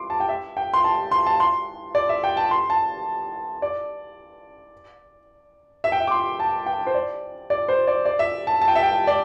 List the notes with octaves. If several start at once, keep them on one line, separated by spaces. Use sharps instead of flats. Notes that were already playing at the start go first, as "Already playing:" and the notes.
Already playing: C6 D6
A5
G5
E5
G5
C6
A5
C6
A5
C6
D5
E5
G5
A5
C6
A5
D5
E5
G5
E5
D6
C6
A5
G5
C5
D5
D5
C5
D5
D5
E5
A5
A5
G5
E5
G5
D5